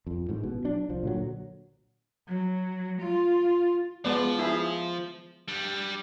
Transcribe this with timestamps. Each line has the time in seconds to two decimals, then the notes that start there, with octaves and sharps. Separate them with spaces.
0.07 F2
0.29 A1 G#2
0.43 B2
0.64 F#3 D4
0.89 C2 F3
1.03 A#2 D3 F#3
2.28 F#3
3.01 F4
4.05 F3 G#3 B3 D5
4.39 E4 G#4 E5
5.48 G3 D4